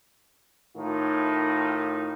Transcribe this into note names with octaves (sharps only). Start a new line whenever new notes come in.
A2 D#3 D#4 F4